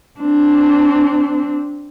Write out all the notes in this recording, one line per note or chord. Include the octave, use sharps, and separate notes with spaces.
C4 D4